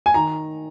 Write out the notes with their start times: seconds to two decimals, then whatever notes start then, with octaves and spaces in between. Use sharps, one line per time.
0.06 G#5
0.14 D#3 A#5